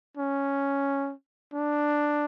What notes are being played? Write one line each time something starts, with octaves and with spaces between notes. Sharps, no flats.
C#4
D4